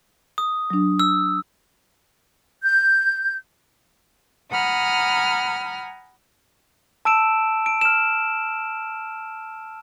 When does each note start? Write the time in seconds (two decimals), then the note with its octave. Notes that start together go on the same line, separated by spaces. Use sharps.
0.38 D#6
0.70 F#3 D4
1.00 E6
2.63 G6
4.51 F#5 G#5 A#5 B5 D#6 F6
7.05 A5 E6 D7 E7
7.66 D7
7.81 F6 E7